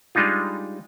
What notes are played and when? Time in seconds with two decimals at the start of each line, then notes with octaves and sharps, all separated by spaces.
0.15 G3 G#3 D4 D#4 F4